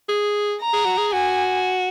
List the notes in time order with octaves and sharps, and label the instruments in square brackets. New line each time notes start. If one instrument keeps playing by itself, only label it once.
[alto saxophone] G#4
[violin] A#5
[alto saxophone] G#4
F#4
G#4
[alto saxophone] F#4 [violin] G#5